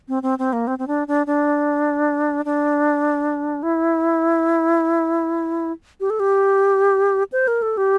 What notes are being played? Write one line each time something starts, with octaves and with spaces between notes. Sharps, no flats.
C4
C4
C4
A#3
C4
C4
D4
D4
D4
D4
E4
G4
A4
G4
C5
A#4
A4
G4